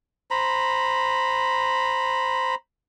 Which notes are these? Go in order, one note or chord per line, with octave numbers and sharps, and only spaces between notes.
C5 A#5 B5